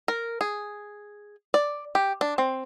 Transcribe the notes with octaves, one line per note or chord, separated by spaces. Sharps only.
A#4
G#4
D5
G4
D4
C4